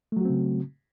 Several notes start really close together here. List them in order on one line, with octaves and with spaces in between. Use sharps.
A3 F#3 F#4 C4 C#3